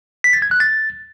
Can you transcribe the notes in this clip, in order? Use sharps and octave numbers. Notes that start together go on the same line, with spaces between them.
B6
A6
G#6
F#6
A6